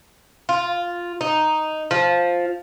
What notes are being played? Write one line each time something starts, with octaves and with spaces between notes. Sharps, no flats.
F4
D#4
F3